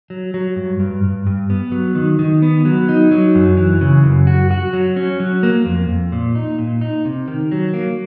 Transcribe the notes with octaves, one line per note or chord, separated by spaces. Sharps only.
F#3
F#3
G2
G2
G2
G2
B3
F#3
D#3
D#3
B3
F#3
D#4
F#3
F#2
E3
C#3
F#2
F#4
F#4
F#3
C#4
F#3
A#3
F2
F2
A#2
D#4
A#2
D#4
C3
D#3
F#3
A#3